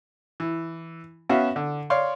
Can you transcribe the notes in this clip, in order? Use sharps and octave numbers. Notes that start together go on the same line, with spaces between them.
E3
B3 C#4 F#4 E5 F5
D3
C#5 D5 F5 C6